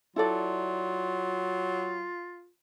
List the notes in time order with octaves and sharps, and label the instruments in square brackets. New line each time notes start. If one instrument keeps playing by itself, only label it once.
[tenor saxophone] F#3 [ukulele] E4 A4 D5 [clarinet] F4